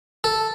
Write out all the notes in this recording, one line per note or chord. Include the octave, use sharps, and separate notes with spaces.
A4